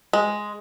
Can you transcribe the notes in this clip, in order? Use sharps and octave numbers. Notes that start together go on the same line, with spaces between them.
G#3